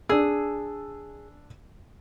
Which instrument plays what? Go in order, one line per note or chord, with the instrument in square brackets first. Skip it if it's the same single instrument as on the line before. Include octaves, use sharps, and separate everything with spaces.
[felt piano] D4 E6 [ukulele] G#4